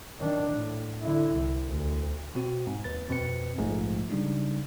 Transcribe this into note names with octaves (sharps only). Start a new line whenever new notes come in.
D#3 D4
A2
D3 E4
C2
D2
B2 C4 F#4
G#2
D#2 B4 A6
F2 B2 C4 B4 C#7
A#1 G#2 F3 G#3 A3
C#3 G3 D4 D#4